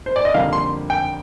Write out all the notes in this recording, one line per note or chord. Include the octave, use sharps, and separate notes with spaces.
C5
D5
D#5
F2 D3 G3 A#3 F5
C6
G5